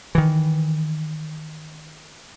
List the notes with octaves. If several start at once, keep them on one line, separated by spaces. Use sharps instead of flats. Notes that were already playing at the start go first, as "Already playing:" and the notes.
D#3 E3